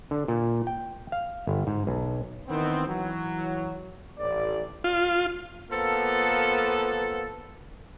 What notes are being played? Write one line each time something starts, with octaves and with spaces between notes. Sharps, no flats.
D3
A#2
G5
F5
G1
G#2
B1
D#3 E3 B3 C4
E3 F#3
A1 D5
F4
F3 A#3 B3 A4